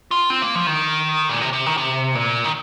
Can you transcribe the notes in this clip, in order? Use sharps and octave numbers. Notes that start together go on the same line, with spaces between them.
F4
C4
A#3
F3
D#3
A#2
C3
C3
D#3
C3
A#2
D#3